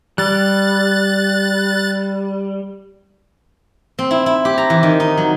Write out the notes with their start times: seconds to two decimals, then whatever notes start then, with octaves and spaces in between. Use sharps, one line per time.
0.18 G3 F#6 A6
3.99 C4
4.11 E4
4.26 E4
4.45 G4
4.58 A#5
4.70 E3
4.83 D#3
5.00 D#4
5.18 F#3